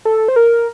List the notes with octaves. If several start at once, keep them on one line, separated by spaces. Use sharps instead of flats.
A4
C5
A#4